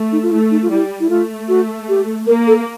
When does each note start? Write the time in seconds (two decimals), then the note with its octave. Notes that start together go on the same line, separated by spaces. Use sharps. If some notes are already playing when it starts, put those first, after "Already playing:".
Already playing: A3
0.12 D#4
0.23 F4
0.32 A3 E4
0.51 D#4
0.62 F4
0.70 G3 E4
1.00 E4
1.10 A3 F4
1.49 F#4
1.89 G4
2.27 A#3 A#4
2.47 A4